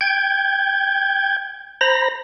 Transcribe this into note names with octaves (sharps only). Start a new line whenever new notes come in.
G5 G6 G#6
C5 A#5 B5 A#6